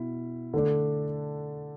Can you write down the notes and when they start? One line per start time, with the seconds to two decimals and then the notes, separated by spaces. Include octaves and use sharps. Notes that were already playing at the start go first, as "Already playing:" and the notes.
Already playing: B2 E4
0.54 D3 A3 D4